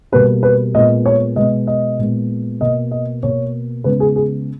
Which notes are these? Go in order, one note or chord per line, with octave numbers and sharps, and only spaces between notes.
B2 G3 A#3 B4
B4
A#2 G#3 B3 D#5
C#5
B2 G#3 B3 D#5
D#5
A#2 G#3 B3
B2 A#3 D#5
D#5
B2 A#3 C#5
C#3 G#3 B3 B4
G#4
G#4